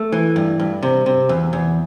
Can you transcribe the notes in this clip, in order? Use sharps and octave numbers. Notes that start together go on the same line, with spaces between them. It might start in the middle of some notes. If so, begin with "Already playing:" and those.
Already playing: A3
E3
G2
G2
C3
C3
E2
E2